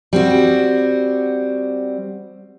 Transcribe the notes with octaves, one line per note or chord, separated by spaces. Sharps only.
G3 C4 F#4